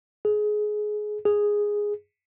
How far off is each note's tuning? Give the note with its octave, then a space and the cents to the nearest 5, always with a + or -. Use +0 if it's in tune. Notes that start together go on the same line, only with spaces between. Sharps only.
G#4 +20
G#4 -5